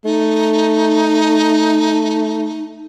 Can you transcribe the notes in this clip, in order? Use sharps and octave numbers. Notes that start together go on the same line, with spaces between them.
A3 D#4